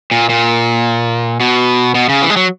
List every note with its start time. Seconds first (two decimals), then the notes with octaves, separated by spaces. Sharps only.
0.11 A#2
0.29 A#2
1.40 B2
1.95 B2
2.09 C#3
2.22 E3
2.30 G#3
2.36 F#3